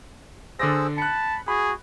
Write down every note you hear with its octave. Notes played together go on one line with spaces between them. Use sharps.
D3 G#4 C5 D5 E6 A#6
A5 B5 F#6 C#7
F#4 G#4 B5